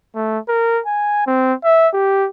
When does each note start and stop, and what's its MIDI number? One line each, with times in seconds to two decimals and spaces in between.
0.15 0.39 57
0.49 0.81 70
0.86 1.22 80
1.27 1.53 60
1.64 1.88 76
1.94 2.28 67